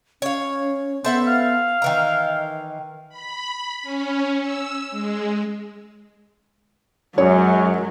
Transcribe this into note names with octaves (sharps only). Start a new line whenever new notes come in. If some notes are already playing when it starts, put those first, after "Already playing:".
C#4 C#5 F5
B3 A4 C5 E5 F#5
F5
D#3 E3 D#5 A#5
B5
C#4
E6
G#3
F#2 F#3 G#3 C#5